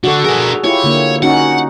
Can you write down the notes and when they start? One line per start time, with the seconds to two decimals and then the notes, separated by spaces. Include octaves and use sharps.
0.04 D3 F#4 A4
0.24 D4 G#4 A#4
0.64 E4 F4 G4 C#5
0.84 D3 A#3
1.22 C#4 D#4 F#4 F#5